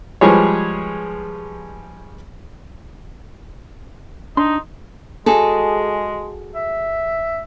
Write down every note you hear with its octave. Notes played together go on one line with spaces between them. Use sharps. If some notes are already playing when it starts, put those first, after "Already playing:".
F3 G3 G#3 G#4 B4 C#5
D4 D#4 C6
G#3 F#4 G#4 A4
E5